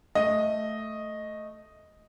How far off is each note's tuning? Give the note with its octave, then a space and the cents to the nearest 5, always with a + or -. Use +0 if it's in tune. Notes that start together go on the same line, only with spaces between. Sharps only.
A3 +0 D#5 +0